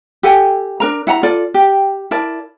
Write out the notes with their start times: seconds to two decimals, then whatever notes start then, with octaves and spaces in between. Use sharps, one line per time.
0.23 G4 A4 F#5 G#5
0.80 D4 A#4 A#5
1.07 E4 F#5 A5 A#5
1.23 F4 A4 D5
1.54 G4
2.11 E4 A#4 D5 A5